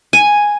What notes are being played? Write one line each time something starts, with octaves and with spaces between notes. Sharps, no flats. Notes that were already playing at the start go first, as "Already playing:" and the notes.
G#5